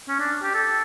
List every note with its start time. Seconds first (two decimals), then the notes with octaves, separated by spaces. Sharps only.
0.08 C#4
0.19 D4
0.43 G4
0.54 A4